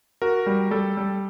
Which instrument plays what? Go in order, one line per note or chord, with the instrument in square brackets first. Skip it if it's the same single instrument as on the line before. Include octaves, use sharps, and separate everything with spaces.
[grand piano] F#4 [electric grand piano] A#4
[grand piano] G3
[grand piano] G3 [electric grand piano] A4
[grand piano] G3